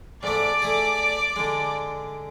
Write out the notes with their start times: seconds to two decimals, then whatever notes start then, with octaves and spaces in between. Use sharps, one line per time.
0.23 G#2 A3 D5 D6
0.62 A3 G#4
1.36 D3 G#3